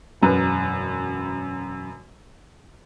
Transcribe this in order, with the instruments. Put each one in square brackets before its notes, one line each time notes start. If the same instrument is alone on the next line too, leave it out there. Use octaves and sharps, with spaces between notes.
[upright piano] E1 F#2 B4